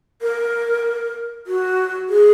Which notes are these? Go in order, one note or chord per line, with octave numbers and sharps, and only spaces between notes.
A#4
F#4
G#4